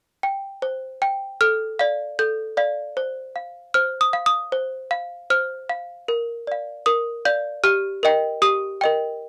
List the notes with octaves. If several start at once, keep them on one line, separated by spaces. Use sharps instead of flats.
G5
C5
G5
A4 F6
D5 F5
A4 G6
D5 F5
C5
F5
C5 F6
D#6
F5
D#6
C5
F5
C5 F6
F5
A#4
D5 F5
A#4 D#6
D5 F5 G6
G4 F6
A#4 D#5 G5
G4 D#6
A#4 D#5 G5